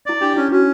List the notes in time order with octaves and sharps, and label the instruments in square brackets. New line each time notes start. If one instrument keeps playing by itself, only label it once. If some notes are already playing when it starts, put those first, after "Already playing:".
[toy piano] E4 [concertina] D5
[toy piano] D4 [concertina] G4
[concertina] C#4 [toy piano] E4
[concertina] C#4 [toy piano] F#4